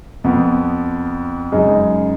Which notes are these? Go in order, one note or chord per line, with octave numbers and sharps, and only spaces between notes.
F2 F3 B3
F#2 C#3 G#3 D#4